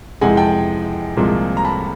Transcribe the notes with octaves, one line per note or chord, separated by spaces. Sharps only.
F2 C3 E3 G#3 F#5 G#5
G5 A5
C2 A#2 F3 G#3 C4
A#5
A5 B5